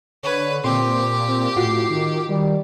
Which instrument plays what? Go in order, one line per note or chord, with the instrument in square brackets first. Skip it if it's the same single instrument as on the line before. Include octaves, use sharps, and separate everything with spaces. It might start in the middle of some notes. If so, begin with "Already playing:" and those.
[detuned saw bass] D3 [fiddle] B4 [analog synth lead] C#5
[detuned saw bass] A#2 [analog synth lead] C4 [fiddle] G4 [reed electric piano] C6
[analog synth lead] C4
[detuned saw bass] A2 [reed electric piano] F4 F#4 [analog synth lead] C7
[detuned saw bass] D#3
[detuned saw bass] D#3 [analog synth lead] G3